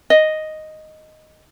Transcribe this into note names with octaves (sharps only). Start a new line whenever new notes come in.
D#5